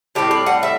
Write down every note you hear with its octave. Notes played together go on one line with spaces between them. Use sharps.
A2 G3 C4 G4
D5
F#5
E5